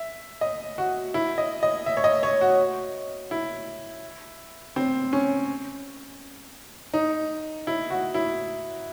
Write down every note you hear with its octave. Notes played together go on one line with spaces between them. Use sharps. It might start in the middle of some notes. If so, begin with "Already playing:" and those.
Already playing: E5
D#5
F#4
E4
D#5
D#5
E5
C#5
D#5
C#5
F#4
E4
C4
C#4
D#4
E4
F#4
E4